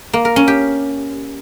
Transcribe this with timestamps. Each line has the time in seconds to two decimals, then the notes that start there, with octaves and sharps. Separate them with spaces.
0.13 A#3
0.25 A#4
0.36 C#4
0.48 G4